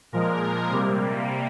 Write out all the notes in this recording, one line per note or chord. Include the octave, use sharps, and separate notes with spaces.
A#2 F3 G#3 A#4
C3 G3 A#3